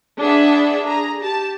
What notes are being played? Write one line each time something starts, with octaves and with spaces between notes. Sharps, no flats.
D4 G#4 B4 E5 F#5
G#4 A#5
G4 A5